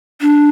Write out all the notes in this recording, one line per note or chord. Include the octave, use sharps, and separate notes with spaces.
D4